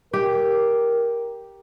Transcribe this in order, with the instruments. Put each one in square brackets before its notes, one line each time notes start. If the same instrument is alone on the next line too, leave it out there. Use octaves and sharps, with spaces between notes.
[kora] G4 [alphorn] A#4